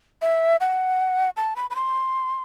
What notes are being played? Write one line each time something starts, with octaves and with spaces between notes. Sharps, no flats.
E5
F#5
A5
B5
B5
C6